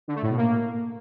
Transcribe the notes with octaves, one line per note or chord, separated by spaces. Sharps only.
D3
A3
A2
B2
A#3